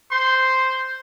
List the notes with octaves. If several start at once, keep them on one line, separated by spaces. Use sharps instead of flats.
C5 C6